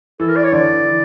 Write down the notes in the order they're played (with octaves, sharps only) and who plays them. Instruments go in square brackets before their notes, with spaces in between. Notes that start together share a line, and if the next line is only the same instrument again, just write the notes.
[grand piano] E3 [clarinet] A4
[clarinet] A#4
D5
C#5
[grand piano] D3 [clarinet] D5
[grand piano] E3